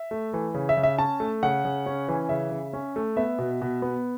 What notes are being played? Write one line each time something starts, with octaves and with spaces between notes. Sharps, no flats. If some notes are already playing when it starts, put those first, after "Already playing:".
Already playing: E5
A3
E3
C#3
E5
C#3
E5
C#4 A5
A3
C#3 F#5
C#3
C#4
E3
C#3 E5
C#3
C#4
A3
B3 E5
B2
B2
B3